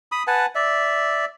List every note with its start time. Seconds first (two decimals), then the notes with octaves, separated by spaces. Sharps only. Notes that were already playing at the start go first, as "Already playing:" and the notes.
0.12 B5 D#6
0.27 B4 F#5 G#5 A5
0.55 D5 E5